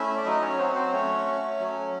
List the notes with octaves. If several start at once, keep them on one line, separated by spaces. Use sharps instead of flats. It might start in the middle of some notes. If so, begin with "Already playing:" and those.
Already playing: A3 C#4 E4 E5
D5
F#3 D#4 D#5
C#4 C#5
C4 F#4 C5
C4 C5
A3 C#4 C#5
C#4
F#3